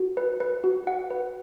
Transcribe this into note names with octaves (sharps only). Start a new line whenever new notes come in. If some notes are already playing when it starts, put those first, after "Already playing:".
Already playing: F#4
B4
B4
F#4
F#5
B4